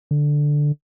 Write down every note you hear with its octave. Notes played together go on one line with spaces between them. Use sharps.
D3